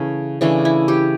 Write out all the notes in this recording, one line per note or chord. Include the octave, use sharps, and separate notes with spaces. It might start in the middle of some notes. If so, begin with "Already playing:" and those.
Already playing: C#3 E3 A3 C#4
C#3 E3 A3 D4
E4
G4